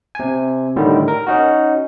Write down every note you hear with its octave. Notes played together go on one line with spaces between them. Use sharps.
C3 G#5
A2 D3 D#3 G3
A#4
C#4 D#4 F#4